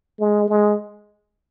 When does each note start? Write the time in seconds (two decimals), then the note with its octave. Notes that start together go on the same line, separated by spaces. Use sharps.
0.20 G#3
0.49 G#3